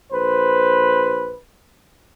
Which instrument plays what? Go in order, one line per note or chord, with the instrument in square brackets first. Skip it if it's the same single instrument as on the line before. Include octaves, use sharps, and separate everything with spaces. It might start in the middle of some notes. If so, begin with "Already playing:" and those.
[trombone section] A#1 B4 C5